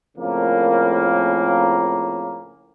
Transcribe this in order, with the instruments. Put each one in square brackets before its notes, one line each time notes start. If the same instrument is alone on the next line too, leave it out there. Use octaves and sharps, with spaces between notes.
[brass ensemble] F2 A2 C#3 A#3